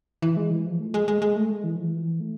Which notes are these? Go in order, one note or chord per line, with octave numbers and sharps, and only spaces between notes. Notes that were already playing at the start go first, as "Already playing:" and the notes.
E3
G#3
E3
F3
A3
G#3
G#3
G#3
A3
G#3
E3
F3
E3
A3